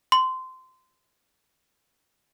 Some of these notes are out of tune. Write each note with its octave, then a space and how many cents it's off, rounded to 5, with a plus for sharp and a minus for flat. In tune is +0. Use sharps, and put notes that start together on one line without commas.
C6 -20